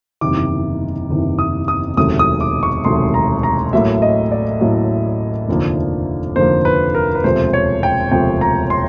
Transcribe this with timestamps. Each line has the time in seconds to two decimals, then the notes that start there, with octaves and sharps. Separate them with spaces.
0.21 F#1 E2 C3 D#3 D6
1.09 F#1 E2 C3 D#3
1.39 D#6
1.68 D#6
1.97 E1 D2 C3 D#3 F#3 D#6
2.19 D#6
2.41 D6
2.63 C#6
2.85 E1 D2 C3 D#3 F#3 C6
3.14 A#5
3.43 A#5
3.73 A1 A2 F#3 A#3 E5
4.02 D#5
4.32 D5
4.61 A1 A2 F#3 A#3
5.48 F1 D#2 D3 F3 A#3
6.36 F1 D#2 D3 F3 A#3 C5
6.65 B4
6.95 A#4
7.15 B4
7.24 E1 D2 C3 F3 C5
7.53 C#5
7.83 G5
8.11 E1 D2 C3 F3 G5
8.41 A#5
8.70 C6